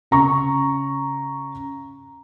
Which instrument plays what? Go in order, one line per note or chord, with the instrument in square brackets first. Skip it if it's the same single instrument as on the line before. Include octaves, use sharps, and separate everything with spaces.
[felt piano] C#3 A#5 C#6